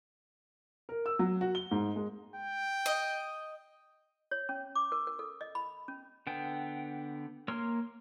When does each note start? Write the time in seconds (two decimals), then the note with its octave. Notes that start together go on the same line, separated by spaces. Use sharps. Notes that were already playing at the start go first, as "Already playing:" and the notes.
0.89 A#4
1.06 E6
1.19 F#3
1.41 F#4
1.55 G7
1.71 G#2
1.96 G#3
2.36 G5
2.86 D#5
4.31 C#5
4.49 C#4
4.75 D6
4.92 A#4
5.07 A#4
5.19 A4
5.41 D#5
5.55 B5
5.88 C#4
6.27 D3 B3 G5
7.48 A#3 C#5 C6 F6